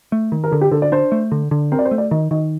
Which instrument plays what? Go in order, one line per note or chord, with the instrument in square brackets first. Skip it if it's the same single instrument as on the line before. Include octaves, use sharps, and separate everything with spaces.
[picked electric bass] A3
D#3
[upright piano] A#4
[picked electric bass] D3 [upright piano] A4
[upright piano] G4
[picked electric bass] D3 [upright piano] A4
[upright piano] D5
[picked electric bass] D4 [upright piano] C5
[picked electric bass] A3
D3
D3
[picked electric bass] C4 [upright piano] A#4
[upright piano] D5
C5
[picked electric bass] A3
[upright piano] D5
[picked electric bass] D#3 [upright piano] D#5
[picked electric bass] D#3 [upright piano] D#5